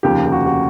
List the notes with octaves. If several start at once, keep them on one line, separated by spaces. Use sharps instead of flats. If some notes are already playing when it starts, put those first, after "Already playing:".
F1 D#2 C#3 F3 G4
G4
F#4
F#4